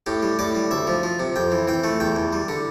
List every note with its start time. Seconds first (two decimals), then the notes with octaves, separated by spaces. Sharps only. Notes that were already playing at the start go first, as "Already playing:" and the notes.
0.06 A2 G4
0.23 G3
0.39 A2 D5
0.55 G3
0.71 D2 E5
0.87 F3
1.03 F3
1.19 C3
1.36 F2 G5
1.52 E3
1.68 E3 G5
1.84 A3
2.00 E2 G5
2.16 E2
2.33 G3
2.48 D3